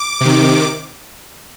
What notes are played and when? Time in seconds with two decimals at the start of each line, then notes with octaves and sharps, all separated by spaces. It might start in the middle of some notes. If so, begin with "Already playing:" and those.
Already playing: D6
0.21 C3 D#3